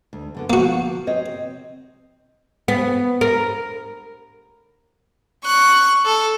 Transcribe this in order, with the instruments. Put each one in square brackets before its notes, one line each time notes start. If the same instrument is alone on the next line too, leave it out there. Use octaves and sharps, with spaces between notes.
[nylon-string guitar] D2
F#2 D3 B3
[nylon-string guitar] F3 [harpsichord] A#3 F#4
[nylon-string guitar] C4 C#5 D#5
[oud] B3
A#4
[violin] C#6 F#6
A4